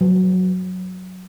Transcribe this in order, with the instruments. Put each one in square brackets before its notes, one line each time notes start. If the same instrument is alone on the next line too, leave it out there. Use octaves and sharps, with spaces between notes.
[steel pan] F#3